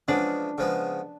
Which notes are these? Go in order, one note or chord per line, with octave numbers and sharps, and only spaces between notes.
C#3 F3 G#3 B3 D4
C#3 F3 G#3 B3